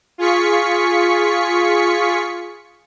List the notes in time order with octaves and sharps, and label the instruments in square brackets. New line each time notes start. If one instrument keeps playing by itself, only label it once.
[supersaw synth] F4 G#4 C#6 B6 C#7